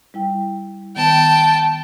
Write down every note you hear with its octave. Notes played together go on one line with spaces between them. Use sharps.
G3 E4 G5
D#3 B3 G5 A5